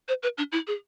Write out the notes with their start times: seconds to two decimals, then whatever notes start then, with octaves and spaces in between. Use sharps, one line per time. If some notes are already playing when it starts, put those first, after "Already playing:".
0.08 C5
0.23 B4
0.38 D4
0.52 E4
0.67 G#4